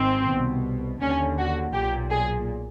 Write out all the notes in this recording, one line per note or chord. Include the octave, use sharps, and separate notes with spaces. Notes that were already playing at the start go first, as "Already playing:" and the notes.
Already playing: G#1 G#2 D#3 C4
C2 B2
D#2 D3 C#4
F#4
B1 A#2 G4
G#4